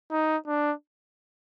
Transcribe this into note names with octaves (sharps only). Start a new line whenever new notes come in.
D#4
D4